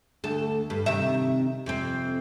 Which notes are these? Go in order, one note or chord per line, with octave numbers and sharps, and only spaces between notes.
D2 A4
G2
C3 D#3 E5
F2 C3 C4